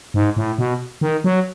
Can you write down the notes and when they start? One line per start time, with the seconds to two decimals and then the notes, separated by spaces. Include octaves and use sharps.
0.14 G#2
0.37 A2
0.58 B2
1.01 D#3
1.24 F#3